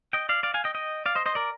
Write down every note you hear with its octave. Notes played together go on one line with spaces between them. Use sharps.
D#5 G5
D5 F5
D5 F5
F5 G#5
D#5 G5
D#5 G5
D5 F5
C5 D#5
C5 D#5
A#4 D5